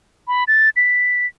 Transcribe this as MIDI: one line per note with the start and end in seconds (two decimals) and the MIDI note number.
0.28 0.44 83
0.48 0.70 93
0.76 1.26 95